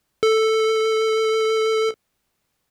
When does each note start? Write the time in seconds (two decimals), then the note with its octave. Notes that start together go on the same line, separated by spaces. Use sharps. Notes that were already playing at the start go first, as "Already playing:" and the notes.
0.23 A4